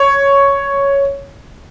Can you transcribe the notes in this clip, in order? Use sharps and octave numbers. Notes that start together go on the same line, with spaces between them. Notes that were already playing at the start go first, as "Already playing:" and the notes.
Already playing: C#5